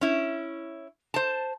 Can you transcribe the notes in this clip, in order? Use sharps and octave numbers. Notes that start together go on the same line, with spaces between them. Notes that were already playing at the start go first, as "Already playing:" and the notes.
C#4 E4
C5 A5